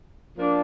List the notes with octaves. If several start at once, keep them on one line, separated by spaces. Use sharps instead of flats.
F3 A#3 D4